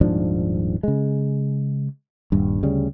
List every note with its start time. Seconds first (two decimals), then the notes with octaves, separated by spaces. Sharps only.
0.01 D#1 G#2 F3 D4
0.83 C#3 G#3
2.32 D#1 G2
2.62 D2 C#3 G3